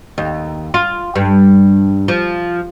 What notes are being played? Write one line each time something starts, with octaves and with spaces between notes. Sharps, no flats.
D#2
F4
G2
F3